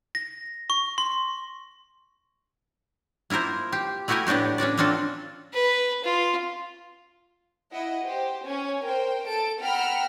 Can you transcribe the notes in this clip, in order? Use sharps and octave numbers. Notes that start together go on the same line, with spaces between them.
A#6
C#6
C6
A#3 E4 F4 A#4 C5
G4
A3 E4 F#4 G4 A#4 G#5
A2 B3 D4 F#4 G4
C#4 D4 F#4 D5
A#3 C4 D4 F4 F#4 A4
B4
F4
E4 D#5 F#5
G4 C5
C#4 G#5
A#4 C5 G5
A4 A5 D7
F#5 G5 A#5 B5 E6 F6